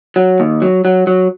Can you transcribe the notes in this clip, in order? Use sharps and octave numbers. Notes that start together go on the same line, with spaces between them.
F#3
D#2
F#3
F#3
F#3